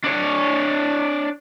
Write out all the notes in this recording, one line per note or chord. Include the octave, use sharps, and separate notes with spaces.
D4 C#5